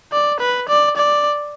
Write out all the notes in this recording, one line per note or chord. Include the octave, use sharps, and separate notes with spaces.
D5
B4
D5
D5